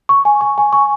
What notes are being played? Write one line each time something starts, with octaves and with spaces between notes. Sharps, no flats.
C#6
G#5
C#6
G#5
C#6